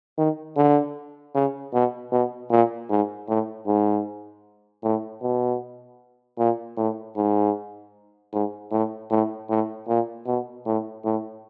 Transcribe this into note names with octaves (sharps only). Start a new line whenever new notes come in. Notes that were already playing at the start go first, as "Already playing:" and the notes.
D#3
D3
C#3
B2
B2
A#2
G#2
A2
G#2
A2
B2
A#2
A2
G#2
G#2
A2
A2
A2
A#2
B2
A2
A2